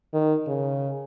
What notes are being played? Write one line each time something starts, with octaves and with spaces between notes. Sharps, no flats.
D#3
C#3